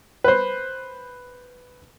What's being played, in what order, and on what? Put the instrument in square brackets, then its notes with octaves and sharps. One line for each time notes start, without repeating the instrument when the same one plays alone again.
[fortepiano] B4 C5